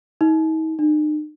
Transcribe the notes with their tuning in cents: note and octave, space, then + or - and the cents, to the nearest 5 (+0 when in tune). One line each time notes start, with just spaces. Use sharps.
D#4 +40
D#4 -45